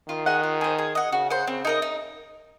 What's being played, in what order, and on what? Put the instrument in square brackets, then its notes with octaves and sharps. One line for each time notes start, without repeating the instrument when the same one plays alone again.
[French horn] D#3 [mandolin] F4
[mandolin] G#4 D#5 F#5
F4
G#4 C5
G#4
D#5 F#5
[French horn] C#3 [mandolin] F#4
[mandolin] C5 F#5
[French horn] C#3 [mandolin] C4
[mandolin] D#4 A#4 D#5
D#4